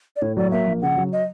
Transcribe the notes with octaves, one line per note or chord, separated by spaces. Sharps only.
D5
A2 C#5
F#3 D5
A#3 E5
A#1
C#3 F#5
F#3
D#5